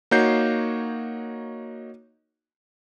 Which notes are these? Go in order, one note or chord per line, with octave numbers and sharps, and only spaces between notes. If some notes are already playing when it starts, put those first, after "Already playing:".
A#3 D#4 F#4 C#5 G6 C7